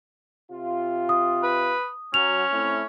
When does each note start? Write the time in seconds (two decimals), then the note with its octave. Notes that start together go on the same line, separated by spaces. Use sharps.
0.50 C3 F4
1.09 D#6
1.43 B4
2.14 F#3 C#4 F7
2.52 A3 C4 E4